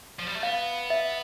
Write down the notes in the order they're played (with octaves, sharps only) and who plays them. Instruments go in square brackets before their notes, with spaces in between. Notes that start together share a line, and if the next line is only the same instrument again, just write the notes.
[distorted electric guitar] F3
G3
A3
[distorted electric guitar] B3 [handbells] F5
[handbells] E5